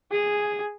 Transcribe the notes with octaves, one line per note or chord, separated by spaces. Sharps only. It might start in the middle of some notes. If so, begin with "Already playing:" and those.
G#4